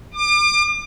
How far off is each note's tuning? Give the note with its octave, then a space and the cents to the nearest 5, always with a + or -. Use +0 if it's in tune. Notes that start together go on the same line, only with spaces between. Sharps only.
D6 +35